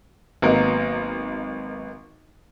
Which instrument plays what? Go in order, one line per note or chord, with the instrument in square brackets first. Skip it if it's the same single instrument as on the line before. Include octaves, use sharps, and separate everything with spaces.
[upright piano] G#1 F#3 A#3 B3 A#4 D#5